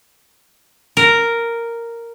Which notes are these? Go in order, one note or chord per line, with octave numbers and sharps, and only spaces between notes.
A#4